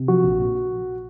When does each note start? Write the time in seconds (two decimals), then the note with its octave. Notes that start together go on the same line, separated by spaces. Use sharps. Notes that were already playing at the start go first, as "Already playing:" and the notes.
Already playing: C3
0.08 F3 F#4
0.24 A#1
0.39 A#2